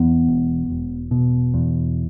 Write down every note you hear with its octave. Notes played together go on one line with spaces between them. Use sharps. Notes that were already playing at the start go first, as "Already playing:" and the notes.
Already playing: E2 B3
E1
E1
B2
E2